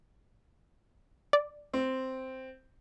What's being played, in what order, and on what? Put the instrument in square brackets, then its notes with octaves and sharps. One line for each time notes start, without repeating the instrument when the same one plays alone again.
[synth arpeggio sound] D5
[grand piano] C4